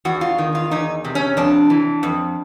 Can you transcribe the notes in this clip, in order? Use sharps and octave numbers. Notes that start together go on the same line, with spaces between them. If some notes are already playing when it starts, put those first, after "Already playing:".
E2 F#4
F4
D#3
F4
E2 D#4
C3
C#4
F2 D4
E3
F2